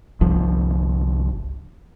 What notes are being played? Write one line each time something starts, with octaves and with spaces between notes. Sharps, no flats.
G1 C2 F3